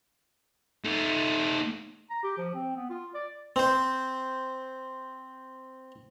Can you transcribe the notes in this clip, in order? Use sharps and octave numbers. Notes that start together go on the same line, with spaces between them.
A3 D#4
A#5
G4
F3
C4
B3
F4
D5
C4 C5